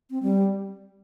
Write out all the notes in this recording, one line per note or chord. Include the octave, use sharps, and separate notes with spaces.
C4
G3